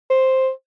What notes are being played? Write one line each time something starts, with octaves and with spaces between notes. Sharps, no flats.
C5